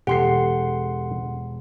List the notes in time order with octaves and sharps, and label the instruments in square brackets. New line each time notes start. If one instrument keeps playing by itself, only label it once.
[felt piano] E1 C7 [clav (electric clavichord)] G4 A4 [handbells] F#5 C6